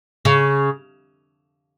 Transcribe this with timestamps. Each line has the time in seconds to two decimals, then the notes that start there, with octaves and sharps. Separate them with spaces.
0.25 C#3